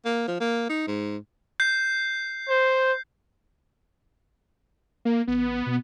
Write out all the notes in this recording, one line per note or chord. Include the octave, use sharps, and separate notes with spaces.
A#3
F3
A#3
D#4
G#2
G6 C7
C5
A#3
A1 B3
B2